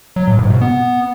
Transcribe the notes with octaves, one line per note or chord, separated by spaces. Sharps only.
F#3
A2
G#2
B2
B3